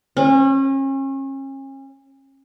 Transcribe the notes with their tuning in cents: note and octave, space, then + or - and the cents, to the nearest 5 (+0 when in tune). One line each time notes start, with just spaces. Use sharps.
C#4 -35